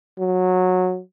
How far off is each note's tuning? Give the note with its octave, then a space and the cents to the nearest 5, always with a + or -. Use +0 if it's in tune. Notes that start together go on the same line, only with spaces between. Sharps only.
F#3 -15